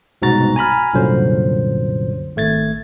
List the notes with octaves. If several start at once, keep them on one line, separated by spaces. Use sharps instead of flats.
C2 G#2 B2 F#4 A#5 A6
G#5 A#5 B5 F6
C2 F#2 A#2 D3 F#3 C5
G#1 A3 G#6 A6